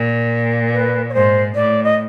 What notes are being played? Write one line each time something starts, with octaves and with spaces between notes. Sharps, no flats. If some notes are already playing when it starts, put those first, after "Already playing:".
Already playing: A#2
B4
C#5
G#2 C5
A2 D5
D#5